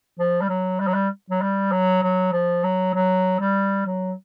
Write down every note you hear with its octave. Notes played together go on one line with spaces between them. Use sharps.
F3
G3
F#3
G3
F#3
G3
F#3
G3
F#3
F#3
F3
F#3
F#3
G3
F#3